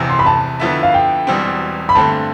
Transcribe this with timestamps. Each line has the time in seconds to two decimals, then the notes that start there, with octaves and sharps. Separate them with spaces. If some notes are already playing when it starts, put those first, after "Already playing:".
Already playing: F1 E2 C3
0.09 C6
0.19 B5
0.26 A5
0.60 F2 D3 F3 B3 E4
0.83 F5
0.94 G5
1.27 E1 E2 B2 G3 C4
1.89 B5
1.95 G2 D3 A3 C4 A5